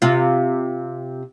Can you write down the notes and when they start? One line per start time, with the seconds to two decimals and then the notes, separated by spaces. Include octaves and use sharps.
0.02 C3 F4